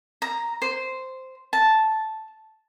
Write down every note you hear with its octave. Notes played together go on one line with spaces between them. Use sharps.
A#5
C5
A5